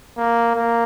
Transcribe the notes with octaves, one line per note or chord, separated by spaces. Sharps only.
A#3
A#3